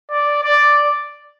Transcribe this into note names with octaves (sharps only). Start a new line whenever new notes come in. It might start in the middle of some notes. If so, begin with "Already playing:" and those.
D5
D5